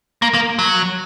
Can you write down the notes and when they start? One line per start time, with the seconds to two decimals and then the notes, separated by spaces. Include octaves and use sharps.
0.22 A#3
0.34 A#3
0.59 F#3